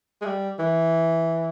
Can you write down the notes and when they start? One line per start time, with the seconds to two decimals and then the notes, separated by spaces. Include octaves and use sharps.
0.22 G#3
0.26 G3
0.59 E3